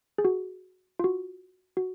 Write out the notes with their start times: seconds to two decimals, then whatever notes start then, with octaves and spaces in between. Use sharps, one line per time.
0.18 G#4
0.25 F#4
0.99 F4
1.04 F#4
1.77 F#4